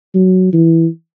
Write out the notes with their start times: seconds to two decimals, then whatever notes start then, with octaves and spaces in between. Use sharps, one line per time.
0.15 F#3
0.53 E3